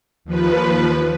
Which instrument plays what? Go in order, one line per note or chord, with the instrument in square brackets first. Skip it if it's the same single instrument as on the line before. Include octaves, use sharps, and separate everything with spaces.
[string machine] D#2 F3 B4